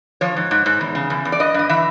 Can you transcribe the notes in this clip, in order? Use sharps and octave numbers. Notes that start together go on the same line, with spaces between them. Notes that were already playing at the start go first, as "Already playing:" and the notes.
F3 C#5
G#2
G#2
G#2
E2
C#3
E2
E2
D5
G2 D#5
G2 D#5
E3 E5